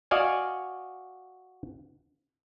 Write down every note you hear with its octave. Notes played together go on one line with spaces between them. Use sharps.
F#4 D5 D#5 F5 G#5